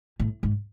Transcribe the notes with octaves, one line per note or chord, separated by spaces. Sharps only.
A2
G#2